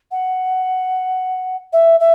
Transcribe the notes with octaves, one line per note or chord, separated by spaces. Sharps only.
F#5
E5
E5